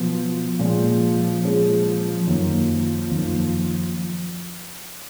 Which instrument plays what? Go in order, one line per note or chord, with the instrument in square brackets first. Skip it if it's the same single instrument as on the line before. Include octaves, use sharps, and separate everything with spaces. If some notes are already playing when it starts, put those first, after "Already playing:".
Already playing: [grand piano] B2 F#3 B3 [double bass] F3
[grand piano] A#2 G#3 C#4 G#4 [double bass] F3
[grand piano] A#2 G#3 C#4 G#4
[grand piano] F#2 D#3 A#3 [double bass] F3
[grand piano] F#2 D#3 A#3